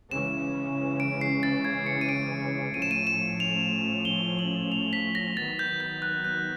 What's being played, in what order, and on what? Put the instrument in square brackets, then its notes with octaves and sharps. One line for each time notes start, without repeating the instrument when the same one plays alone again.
[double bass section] C#3 E3 G#3 C#4 [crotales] E7
[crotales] D7
C7
A6
G#6
C#7
D#7
D7
[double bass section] A2 F3 A3 C#4 [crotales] D#7
[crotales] E7
D#7
E7
F7
G7
F#7
F7
B6
A#6
[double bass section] D#3 F#3 B3 [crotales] A6
[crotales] G6
G6
F#6
F#6